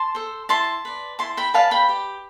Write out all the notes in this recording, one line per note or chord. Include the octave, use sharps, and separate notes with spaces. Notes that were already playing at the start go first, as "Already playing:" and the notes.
Already playing: A5 C6
A4 C5
E4 A5 C6
B4 D5
E4 A5 C6
G5 B5
B4 D5 F5 A5
G5 B5
G4